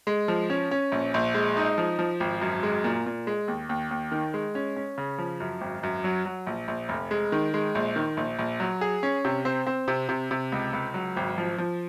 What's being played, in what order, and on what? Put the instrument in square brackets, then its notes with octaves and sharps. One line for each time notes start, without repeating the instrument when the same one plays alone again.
[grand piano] G#3
F3
C#4
C#4
A#1
A#1
G#3
D#4
F3
F3
G#1
F#2
G#3
A#2
A#2
G#3
D#2
D#2
D#2
D#3
G#3
C#4
C#4
C#3
F3
F#2
G#1
F#2
F#3
F#3
A#1
A#1
F1
G#3
D#3
G#3
A#1
D#3
A#1
A#1
F#3
G#4
C#4
C3
C4
C4
C3
C3
C3
C#2
C#2
F#3
G#1
F3
F3